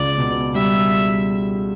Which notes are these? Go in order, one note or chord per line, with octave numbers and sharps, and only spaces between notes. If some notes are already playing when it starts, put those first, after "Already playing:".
Already playing: C#2 D5
B2
G3 E5